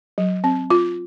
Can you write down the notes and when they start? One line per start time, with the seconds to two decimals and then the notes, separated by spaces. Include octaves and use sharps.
0.18 F#3
0.44 C4
0.70 F4